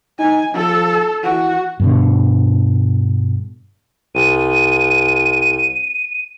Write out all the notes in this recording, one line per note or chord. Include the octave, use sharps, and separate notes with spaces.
D#4 G#5
F3 A4
E3 F#4
G2 B2 D3
C2 D#7